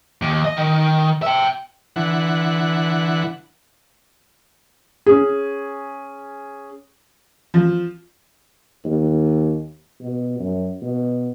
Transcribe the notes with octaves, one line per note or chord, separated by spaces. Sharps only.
D#2
D#5
D#3
E5 G5
D3 E3 F#5
C#4 G#4
F3
D#2
B2
F#2
B2